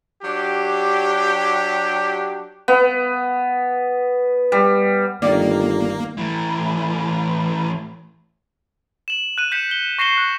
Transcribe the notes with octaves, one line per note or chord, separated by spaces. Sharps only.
F#3 D4 G4
B3
G3
G1 D#3 A#3 D5
A2 E3
E7 F#7
F#6 D#7
F#6 G6 B6 C#7 D#7 E7
G7
C#6 A#6 C7 C#7 E7 G7
F#6